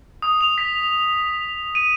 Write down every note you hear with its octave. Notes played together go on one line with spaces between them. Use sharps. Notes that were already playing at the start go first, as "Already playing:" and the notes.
D#6
F7
B6
D#7